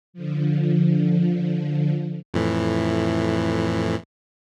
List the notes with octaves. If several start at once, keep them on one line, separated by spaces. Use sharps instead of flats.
D3 F3
F2 A2 E3